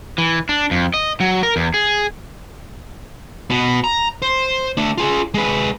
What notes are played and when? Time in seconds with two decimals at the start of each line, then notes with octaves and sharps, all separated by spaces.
0.18 E3
0.49 D4
0.71 F2
0.94 D#5
1.20 F#3
1.43 A#4
1.56 E2
1.74 G#4
3.50 B2 B3
3.84 A#5
4.22 C5
4.77 A3 D4
4.98 F4 G#4
5.34 G#3 B4